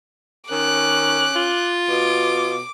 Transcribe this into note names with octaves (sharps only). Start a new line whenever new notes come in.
D#3 C#4 D6 F#6
F4
B2 D6